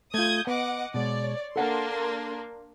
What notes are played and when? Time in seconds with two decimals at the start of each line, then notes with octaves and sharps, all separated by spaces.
0.14 A3 F4 D#6 G6 G#6
0.47 B3 D#5 F#5 D6
0.94 B2 G#3 C#5 D5
1.56 A#3 D4 A4 F#5 A5 C6